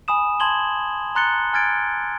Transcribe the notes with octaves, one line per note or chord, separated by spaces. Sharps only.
G#5 B5 D#6 E7
A5 C6 G#6 F#7 G7
A#5 C6 F#6 A6 C#7 G7
G#5 F6 G#6 A6 D7